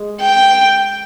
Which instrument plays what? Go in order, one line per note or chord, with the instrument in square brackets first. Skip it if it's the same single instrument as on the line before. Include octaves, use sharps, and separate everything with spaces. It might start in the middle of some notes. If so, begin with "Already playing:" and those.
Already playing: [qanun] G#3
[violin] G5